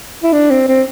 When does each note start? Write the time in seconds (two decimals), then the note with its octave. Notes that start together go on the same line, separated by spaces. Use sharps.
0.23 E4
0.32 D4
0.50 C4
0.68 C4